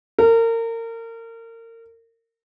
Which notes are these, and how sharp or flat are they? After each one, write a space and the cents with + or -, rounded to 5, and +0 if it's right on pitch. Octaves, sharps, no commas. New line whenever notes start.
A#4 -30